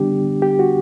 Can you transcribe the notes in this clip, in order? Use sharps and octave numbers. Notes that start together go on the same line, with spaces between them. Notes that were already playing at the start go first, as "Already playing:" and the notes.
Already playing: D3 G3 B3 D4 G4
G4
F#4